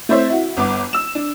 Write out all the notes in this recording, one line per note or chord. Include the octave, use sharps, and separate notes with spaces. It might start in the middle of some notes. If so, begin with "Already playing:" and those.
A3 C4 E4 C5 C#5 E5
E4 F#4
G1 B3 D6
E6 E7
D4